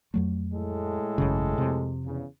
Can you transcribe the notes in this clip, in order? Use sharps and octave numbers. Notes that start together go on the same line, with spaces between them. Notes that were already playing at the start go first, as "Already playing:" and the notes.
F2 F#3 A3
A2 G#3 A4
G#1 F#2 C#3
F2 C3
E2 C#3